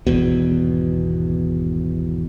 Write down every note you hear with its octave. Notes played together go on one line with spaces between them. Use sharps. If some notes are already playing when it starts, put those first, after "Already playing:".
G#1 E2 B2